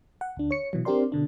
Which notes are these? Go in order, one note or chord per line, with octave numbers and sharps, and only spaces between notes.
F#5
D2 D4
C#5 C#7
B2 E3 F#3
C4 D4 G4 A#4 D5 C6
B2 D3 D4